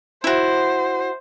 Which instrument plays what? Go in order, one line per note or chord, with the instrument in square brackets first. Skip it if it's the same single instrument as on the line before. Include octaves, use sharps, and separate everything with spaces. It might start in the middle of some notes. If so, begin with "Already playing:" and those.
[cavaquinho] E4 F#4 [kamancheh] C5